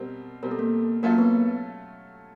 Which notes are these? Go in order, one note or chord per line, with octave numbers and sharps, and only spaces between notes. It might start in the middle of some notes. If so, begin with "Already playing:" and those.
Already playing: B2 G3 C4 A#4
B2 G3 C4 A#4
A4
A#3 A#4
F#3 A3 A#3 C#4 F4 A4 A#4
B3 B4